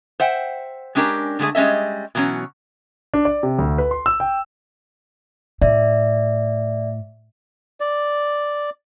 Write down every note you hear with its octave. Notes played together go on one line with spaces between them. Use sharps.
C5 E5 F#5 G5
G#3 C#4 D4 G4 A#4
D3 G#3 A3 E4 G#4
G3 G#3 C#4 D#5 E5
B2 E3 F#3 A#3 C#4 C#5
D4
D5
C3
D2
B4
C6
E6
G5
A2 D5 E5
D5